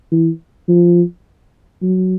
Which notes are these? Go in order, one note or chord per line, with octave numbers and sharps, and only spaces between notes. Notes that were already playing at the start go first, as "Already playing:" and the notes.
E3
F3
F#3